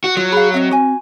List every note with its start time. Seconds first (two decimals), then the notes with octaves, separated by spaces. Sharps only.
0.04 F#4
0.17 F#3 F4
0.32 G#4 F5 B5
0.54 C4 D#5 E5
0.71 F#4 G#5